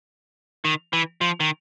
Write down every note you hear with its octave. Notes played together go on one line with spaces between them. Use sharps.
D#3
E3
F3
D#3